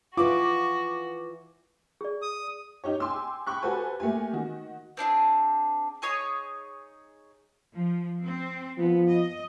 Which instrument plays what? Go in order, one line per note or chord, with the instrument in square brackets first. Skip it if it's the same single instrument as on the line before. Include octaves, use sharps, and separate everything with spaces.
[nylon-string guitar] E3 B4 D5 [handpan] F4 [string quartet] F#4 [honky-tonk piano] D6
[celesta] G#4 D5
[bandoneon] D#6
[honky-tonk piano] D#4 G4 C#5
G5 G#5 C6 D6 E6
G5 B5 C#6 F#6
F#4 G4 A4 B4 C5 G#5
A3 A#3 G4 G#5
D#3 F#4
[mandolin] C4 D4 E4 G#4
D#4 G#4 C#5 D#6
[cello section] F3
C4
[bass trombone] F3 [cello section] B3
[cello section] D#5